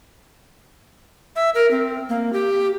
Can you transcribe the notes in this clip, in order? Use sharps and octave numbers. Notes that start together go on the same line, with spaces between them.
E5
A#4
C4
A#3
G4